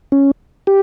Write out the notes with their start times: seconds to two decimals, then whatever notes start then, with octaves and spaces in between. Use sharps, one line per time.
0.12 C#4
0.67 G4